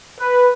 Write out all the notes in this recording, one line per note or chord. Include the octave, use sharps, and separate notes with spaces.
B4